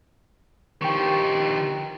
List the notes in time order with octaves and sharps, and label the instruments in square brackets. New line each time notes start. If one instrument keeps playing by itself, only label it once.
[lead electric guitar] D#3 F3 [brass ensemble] D#4 G4 [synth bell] G5 C#6